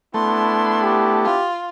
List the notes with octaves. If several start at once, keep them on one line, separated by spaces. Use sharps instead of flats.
A3 B3 D4 E4 C6
G4
F4